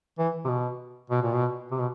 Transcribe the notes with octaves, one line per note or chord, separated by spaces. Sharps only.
E3
C3
B2
B2
A#2
B2
C3
B2